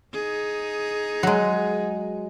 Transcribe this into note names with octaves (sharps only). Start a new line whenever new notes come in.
D#4 G#4
F#3 G#3